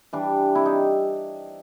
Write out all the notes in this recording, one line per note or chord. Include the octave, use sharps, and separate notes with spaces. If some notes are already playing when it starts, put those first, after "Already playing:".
E3 G3 D4
C3 E4
D#4